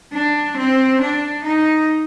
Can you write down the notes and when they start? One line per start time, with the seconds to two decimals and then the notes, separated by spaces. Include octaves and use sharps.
0.13 D4
0.57 C4
1.01 D4
1.44 D#4